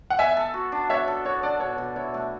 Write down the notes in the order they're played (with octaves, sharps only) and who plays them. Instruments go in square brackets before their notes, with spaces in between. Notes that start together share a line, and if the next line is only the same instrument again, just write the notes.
[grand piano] F#5
[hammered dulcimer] B3 [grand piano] E5 G#5
[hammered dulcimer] A4
F#4
D4
[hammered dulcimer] B3 [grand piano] C#5 E5
[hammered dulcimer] A4
[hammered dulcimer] F#4 [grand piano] C#5
[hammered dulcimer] D4 [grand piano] D5
[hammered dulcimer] B2 [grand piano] C#5
[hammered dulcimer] B2
[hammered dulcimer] E4 [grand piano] C#5
[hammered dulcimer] A3